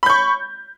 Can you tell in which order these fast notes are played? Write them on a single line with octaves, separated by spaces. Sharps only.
B5 G6 C#6